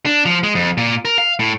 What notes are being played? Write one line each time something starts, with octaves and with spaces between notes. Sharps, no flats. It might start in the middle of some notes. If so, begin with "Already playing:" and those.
D4
F3
G#3
F2
A#2
A#4
F5
A2